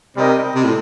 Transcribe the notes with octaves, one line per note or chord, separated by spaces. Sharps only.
C3 G3 C4 D#4 A#4 D#5
C3
A2